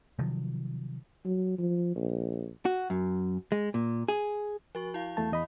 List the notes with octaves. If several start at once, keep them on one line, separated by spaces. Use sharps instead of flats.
C3 D#3 F3 F#3
F#3
F3
A#1
F#4
F#2
G#3
A#2
G#4
F3 F#4 C#6
E4 F5
E2 A3 A5
E2 D#5 B5